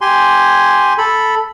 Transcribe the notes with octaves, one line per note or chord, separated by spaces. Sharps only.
G4 G#5 C6
A4 B5